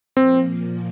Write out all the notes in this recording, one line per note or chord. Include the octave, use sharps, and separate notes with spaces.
A#2 F3 A#3 C4